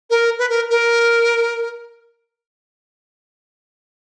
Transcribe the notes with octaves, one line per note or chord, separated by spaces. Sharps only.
A#4
B4
A#4
A#4